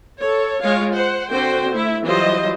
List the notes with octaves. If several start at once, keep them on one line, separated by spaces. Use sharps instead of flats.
A4 C#5
G#3 F4 C#5 F5
C5 F#5
D3 C4 F#4 C5 G5
A3 E4 E5
E3 F#3 G3 F4 C5 D#5